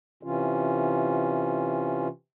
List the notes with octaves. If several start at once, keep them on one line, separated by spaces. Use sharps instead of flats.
C3 E3 C#4 F4